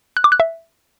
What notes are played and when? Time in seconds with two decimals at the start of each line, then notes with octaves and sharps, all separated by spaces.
0.17 F#6
0.24 D6
0.32 F#6
0.40 E5